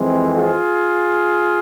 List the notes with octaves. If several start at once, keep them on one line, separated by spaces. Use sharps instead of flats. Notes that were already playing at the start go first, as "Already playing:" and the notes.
Already playing: F2 E3 G#3 C4
F4 G#4